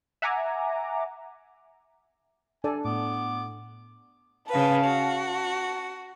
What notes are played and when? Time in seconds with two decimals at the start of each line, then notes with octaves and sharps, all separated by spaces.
0.22 E5 F#5 G#5 A#5 D6
2.64 D4 A4 D5 G#5
2.85 A2 B3 D6
4.50 C#3 B4 F5 A5
4.84 F#4
5.26 A5